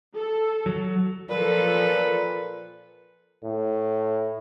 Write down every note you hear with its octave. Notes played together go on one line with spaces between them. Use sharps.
A4
F#3
A#2 F3 A4 B4
A2